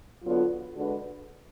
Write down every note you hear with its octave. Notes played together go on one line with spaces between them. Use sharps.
D3 F#3 B3 F4
D3 G#3 D4 F#4 B4